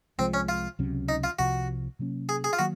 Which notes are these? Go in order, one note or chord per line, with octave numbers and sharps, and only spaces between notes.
C2 C3 F3 G#3 C4
C#4
F4
C#2 C3 F#3 C#4
D#4
F4
C2 C3 F3 F#4
C3 F#3 A#3 C#4
G#4
G#4
F4
D#3 F#3 A#3 F#4